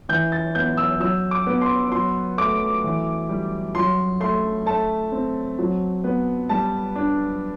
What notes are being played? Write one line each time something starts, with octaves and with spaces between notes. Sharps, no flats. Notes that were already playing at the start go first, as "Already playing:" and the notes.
E3 G6
A6
B3 G6
E6
F#3 E6
D6
B3
C6
F#3 C6
A3 D6
E3
G3
F#3 C6
A3 C6
A3 A5
C4
F#3
B3
G3 A5
D4